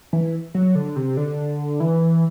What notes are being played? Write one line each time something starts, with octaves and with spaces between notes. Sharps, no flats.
E3
F#3
D3
C3
D3
E3